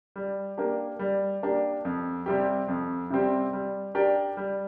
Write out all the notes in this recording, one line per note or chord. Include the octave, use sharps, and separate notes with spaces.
G3
A#3 D4 G4
G3
A#3 D4 G4
F2
C3 G3 C4 G4
F2
C3 G3 C4 G4
G3
D4 G4 A#4 D5
G3